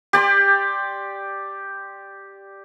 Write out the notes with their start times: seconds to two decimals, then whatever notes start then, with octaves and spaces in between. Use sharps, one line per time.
0.13 G4 D5 C6